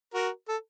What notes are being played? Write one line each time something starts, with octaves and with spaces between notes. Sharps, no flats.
F#4 A#4
A4